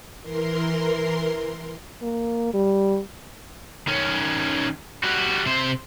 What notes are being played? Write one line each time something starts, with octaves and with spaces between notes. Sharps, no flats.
E3 A#4 C6
A#3
G3
D#3 C#4
G3 F#4
C3 C5